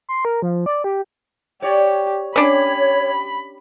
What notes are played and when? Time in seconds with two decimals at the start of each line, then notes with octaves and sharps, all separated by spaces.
0.09 C6
0.25 A#4
0.42 F3
0.66 D5
0.84 G4
1.62 G4 C#5 D5
2.36 C#4 D4 G4 C#5 B5